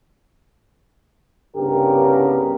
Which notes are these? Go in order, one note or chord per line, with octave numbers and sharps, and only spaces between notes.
C2 G2 C#3 B3 G4 A#4